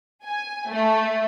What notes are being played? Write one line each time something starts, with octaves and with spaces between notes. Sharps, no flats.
G#5
A3